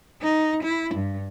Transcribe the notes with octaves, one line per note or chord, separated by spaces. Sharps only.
D#4
E4
G2